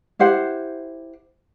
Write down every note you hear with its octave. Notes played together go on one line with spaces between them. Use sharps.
E4 G4 C5 F#5